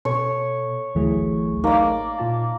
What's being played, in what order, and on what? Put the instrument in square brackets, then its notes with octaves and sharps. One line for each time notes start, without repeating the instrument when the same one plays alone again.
[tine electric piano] B2 [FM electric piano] A4 [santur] C#5
[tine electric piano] A1 A3 G#4 [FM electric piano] D2 E3 F#3
[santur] A#3 D5 [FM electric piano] D#4
[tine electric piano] A#2 F4 A5